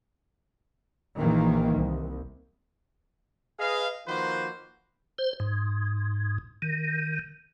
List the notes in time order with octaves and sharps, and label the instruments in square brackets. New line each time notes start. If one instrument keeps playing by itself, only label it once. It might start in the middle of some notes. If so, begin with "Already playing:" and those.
[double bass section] A#1 D#3 E3 A#3
C2
[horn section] G#4 B4 D#5 F5
D#3 F3 A#3 F#4 B4 C5
[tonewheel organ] C5
G#2
D#3